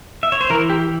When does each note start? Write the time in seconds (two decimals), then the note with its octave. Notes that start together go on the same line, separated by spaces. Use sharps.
0.23 E5
0.32 C#5
0.41 C5
0.50 E3 A#4
0.70 G4